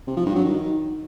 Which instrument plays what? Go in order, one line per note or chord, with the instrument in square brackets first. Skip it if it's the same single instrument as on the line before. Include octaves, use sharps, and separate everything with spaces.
[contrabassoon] C3
F3
G2
F#3
D#3